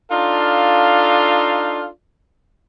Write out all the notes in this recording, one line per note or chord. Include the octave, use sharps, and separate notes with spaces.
D4 D#4 F4 A4 F5